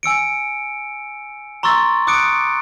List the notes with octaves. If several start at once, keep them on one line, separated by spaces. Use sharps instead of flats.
G#5 E6 C#7 D7
A#5 C6 C#6 E6 A6
D6 D#6 F#6 C#7 D7